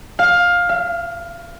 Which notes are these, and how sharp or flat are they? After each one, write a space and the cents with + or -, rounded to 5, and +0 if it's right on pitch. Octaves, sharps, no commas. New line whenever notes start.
F5 +15
F5 -40